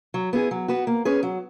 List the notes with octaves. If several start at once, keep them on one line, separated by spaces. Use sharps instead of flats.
F#3
B3 E4 G#4
F#3
B3 F#4 B4
A#3
C#4 G#4 B4
F#3